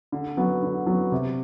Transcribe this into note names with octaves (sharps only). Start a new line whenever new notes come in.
D3
F#3 B3
D3
F#3 B3
C3